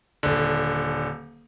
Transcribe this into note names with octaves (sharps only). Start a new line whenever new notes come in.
D#1 D3